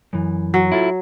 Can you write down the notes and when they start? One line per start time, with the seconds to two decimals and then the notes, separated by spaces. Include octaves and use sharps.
0.13 F#2 E3
0.54 F#3
0.72 E4 F4 A4